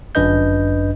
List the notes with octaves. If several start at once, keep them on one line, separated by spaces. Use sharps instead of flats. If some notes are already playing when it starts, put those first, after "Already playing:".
G1 F#2 D4 B4 D#5 G6